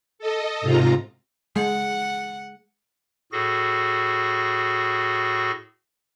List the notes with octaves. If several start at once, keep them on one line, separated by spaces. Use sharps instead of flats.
A4 D#5
G#2 C3 F4 A#5
G#3 F#5
A2 F#4 G#4 A4 A#6